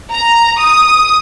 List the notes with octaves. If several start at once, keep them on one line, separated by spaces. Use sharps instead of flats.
A#5
D#6